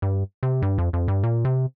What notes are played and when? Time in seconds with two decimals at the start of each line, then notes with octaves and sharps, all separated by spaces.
0.02 G2
0.43 C3
0.62 G2
0.78 F2
0.93 F2
1.08 G2
1.23 A#2
1.45 C3